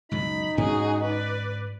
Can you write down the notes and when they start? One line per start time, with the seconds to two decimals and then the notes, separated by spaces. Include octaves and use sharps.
0.11 C#2 F#2 B2 D#4 B5
0.57 D2 G#2 C#4 F#4 G#4
1.02 B4 D5